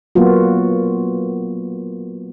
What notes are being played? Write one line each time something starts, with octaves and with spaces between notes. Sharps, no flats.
F#3 A#3 B3 F4 F#4